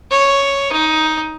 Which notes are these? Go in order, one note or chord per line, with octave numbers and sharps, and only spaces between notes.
C#5
D#4